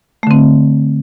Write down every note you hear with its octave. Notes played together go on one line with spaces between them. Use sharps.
D3 A3 C4